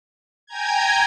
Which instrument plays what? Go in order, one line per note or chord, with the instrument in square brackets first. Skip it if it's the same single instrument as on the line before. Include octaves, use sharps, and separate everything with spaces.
[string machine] G5 G#5 A#5 G6 G#6